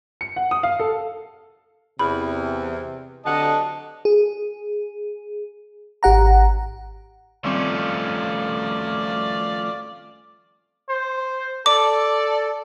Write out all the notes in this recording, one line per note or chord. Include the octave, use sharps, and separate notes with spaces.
C#7
F#5
D#6
F5
A4
E2 C3 B5
D3 F#3 G4 D#5 F#5 A5
G#4
G#1 G4 F#5 A#5
D#3 F3 G3 A3 C4 C#4 D5 F5
C5
A4 D5 D6